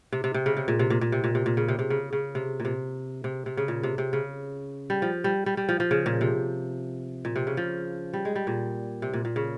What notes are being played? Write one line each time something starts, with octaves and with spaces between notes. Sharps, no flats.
C3
C3
C3
C#3
C3
A#2
C3
A#2
A#2
C3
A#2
C3
A#2
C#3
C3
C3
C#3
C#3
C3
A#2
C3
C3
C3
C#3
A#2
C3
C3
C#3
G3
F3
G3
G3
G3
F3
F3
C#3
A#2
C3
A#2
C3
C#3
F3
G3
G#3
G3
A#2
C3
A#2
A#2
C#3